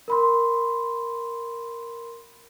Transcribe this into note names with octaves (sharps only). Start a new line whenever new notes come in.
A#4 B5 C6